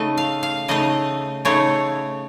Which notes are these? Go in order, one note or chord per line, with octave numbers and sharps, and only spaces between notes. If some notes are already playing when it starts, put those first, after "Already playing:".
Already playing: C#3 A3 D#4 D#5
F5
F5
C#3 A3 D#4 D#5
C#3 A3 D#4 C#5